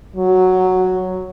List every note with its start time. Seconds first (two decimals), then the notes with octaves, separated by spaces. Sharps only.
0.16 F#3